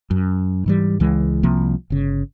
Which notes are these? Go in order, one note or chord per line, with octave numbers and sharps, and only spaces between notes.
F#2
G#2 E3 G3
C#2 E3 G#3
C2 C3 F3 A#3
G1 C#3